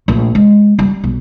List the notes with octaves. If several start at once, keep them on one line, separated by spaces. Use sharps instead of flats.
A#1 A3
G#3
G3
B1